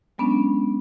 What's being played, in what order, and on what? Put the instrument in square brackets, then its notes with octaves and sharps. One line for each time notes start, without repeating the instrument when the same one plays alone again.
[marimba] F#3 G#3 B3 C#4 D4